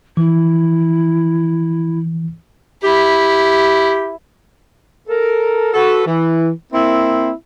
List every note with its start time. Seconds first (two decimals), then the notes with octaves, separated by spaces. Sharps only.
0.17 E3 E4
2.83 E4 G4
5.09 A4 A#4
5.74 F#4 A4 B4
6.07 E3
6.73 A#3 C4 E4